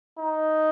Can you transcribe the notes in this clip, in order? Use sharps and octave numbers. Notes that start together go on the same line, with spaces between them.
D#4